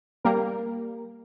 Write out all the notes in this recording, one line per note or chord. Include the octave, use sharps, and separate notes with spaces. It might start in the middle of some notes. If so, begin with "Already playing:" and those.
G3 A#3 A#4